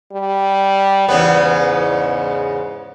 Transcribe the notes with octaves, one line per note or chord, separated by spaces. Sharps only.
G3
E2 G#2 C#3 B3